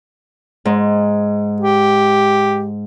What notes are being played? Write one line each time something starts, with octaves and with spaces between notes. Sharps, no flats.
G#2
G4